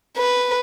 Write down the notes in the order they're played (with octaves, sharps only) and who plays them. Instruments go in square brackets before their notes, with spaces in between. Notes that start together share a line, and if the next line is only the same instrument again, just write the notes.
[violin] B4